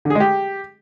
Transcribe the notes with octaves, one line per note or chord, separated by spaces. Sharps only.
D3
G#4
G#3
G4